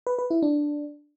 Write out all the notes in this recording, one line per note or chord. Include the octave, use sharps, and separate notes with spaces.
B4
B4
E4
D4